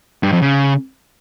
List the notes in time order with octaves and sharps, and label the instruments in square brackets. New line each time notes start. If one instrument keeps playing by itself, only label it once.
[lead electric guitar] G2
F2
C#3